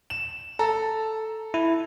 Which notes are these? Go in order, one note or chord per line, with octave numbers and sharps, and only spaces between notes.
E7
A4 A#5
E4